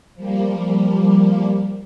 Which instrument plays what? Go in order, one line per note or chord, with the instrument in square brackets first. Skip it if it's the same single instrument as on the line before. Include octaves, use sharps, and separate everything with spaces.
[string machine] F3 G3 A#3